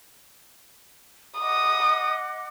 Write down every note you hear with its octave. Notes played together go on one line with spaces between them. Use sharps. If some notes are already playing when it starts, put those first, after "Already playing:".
D#5 F#5 D6 D#6